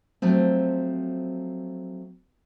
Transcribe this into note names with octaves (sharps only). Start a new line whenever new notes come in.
F3 F#3 A3 C4